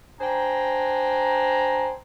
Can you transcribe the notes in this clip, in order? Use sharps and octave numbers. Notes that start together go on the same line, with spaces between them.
D4 C5 G5 G#5 A#5